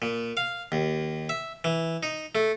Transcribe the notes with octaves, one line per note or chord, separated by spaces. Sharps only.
A#2
F5
D#2
E5
E3
D#4
A3